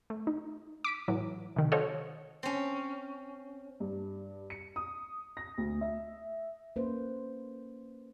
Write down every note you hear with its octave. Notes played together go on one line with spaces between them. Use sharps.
A3
D#4
D6 B6 D7
A2 E3 F#3
C3 D#3
F#4 A4 C5 C#5 D#5 F5
C4 C#4
G2
C#7
D#6
A#6
D2
E5
A#3 C#4 B4 C5